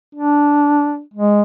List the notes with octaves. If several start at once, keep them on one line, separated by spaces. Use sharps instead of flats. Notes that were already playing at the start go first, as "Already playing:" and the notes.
D4
G#3